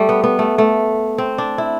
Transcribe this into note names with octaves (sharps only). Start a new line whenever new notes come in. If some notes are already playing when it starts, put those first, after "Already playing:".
Already playing: G3 A3
B3
B3
A3
A3
C4
D4
E4